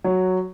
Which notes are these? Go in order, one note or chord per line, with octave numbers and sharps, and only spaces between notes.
F#3